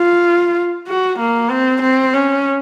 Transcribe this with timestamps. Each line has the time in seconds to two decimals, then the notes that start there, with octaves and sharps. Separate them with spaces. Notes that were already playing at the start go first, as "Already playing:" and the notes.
Already playing: F4
0.88 F#4
1.19 A#3
1.51 C4
1.82 C4
2.14 C#4